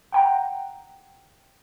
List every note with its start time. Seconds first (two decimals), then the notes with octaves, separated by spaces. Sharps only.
0.12 F#5 G5 A#5